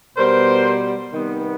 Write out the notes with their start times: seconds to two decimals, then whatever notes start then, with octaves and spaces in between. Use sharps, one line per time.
0.17 B2 G3 B3 A#4 C5
1.13 C3 D#3 G3 B3